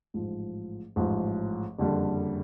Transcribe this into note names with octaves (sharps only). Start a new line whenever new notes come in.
A1 G#2 F3
A1 G#2 F3
F#1 F2 D3 G3